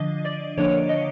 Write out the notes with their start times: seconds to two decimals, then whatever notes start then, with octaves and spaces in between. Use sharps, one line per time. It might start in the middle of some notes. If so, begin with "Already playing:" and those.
Already playing: D3 F3 D4 D#5
0.25 D5
0.58 D3 F3 A#3 D4 C#5
0.89 D#5